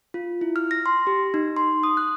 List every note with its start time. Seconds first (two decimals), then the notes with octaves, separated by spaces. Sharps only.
0.14 F4
0.41 E4
0.56 F6
0.71 A#6
0.86 C6
1.07 G4
1.34 D#4
1.56 C6
1.83 D#6
1.97 F#6